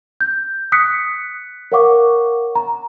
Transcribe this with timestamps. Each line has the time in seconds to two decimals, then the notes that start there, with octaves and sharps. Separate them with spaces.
0.21 G6
0.72 D#6 F#6 B6 C#7
1.72 A#4 C#5 F5 F#5 C#6 D6
2.55 A#5